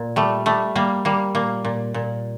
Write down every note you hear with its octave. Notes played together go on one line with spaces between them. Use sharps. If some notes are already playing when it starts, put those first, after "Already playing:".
Already playing: A#2
G3 A3
G3 A3
G3 A#3
G3 A#3
A#2 A#3
A#2
A#2